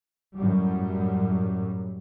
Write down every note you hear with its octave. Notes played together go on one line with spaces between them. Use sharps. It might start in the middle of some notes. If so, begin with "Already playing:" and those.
F#2 A2 F#3 G3